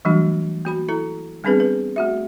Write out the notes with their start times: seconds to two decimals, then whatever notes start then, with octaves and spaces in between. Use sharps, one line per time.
0.05 E3 F#3 G3 A3 D4 F#4
0.65 A#3 F#4 B5
0.89 E4 A4 A#5
1.44 G3 B3 C4 D4 G#4 B4
1.60 B4
1.96 A3 F#4 E5